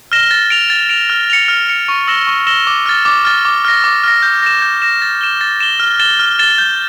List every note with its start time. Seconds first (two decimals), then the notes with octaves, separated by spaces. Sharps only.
0.12 F6 A#6 E7 G7
0.31 A6
0.50 D7 F7
0.70 A6
0.89 D7 F7
1.10 F6
1.30 C#7 F7
1.48 F6
1.68 C#7 F7
1.88 C#6
2.07 E6 A#6 E7 G7
2.27 C#6
2.47 E6 A#6 E7 G7
2.67 D6
2.86 F6 A6
3.05 D6
3.25 F6 A6
3.45 D6
3.65 F6 A#6
3.84 D6
4.04 F6 A#6
4.23 G6
4.42 A#6 E7
4.62 G6
4.82 A#6 E7
5.02 A6
5.21 E7 G7
5.41 A6
5.60 E7 G7
5.80 F6
5.99 A6 E7 G7
6.19 F6
6.39 A6 E7 G7
6.58 G6